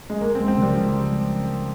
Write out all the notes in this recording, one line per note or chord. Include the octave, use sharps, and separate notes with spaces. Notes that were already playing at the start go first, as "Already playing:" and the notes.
G#3
C#2 A#3
C4
G#3
C4
C#3 G3
F3